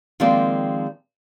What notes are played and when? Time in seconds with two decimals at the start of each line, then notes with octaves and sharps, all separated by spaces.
0.20 D#3 F3 G#3 A#3 C4 D5